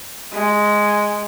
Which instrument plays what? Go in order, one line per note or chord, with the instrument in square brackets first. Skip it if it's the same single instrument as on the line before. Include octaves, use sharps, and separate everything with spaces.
[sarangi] G#3